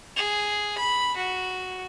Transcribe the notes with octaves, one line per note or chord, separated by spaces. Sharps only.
G#4
B5
F#4